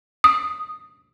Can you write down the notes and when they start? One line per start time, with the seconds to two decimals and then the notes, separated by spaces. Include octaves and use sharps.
0.24 D#6